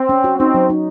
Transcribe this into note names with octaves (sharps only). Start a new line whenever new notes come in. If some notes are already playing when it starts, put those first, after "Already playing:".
Already playing: C4
C#4
F#4
C4 D#4
F#3
D#4